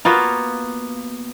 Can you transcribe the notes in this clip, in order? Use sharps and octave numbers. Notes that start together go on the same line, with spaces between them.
A#3 B3 F4 F#4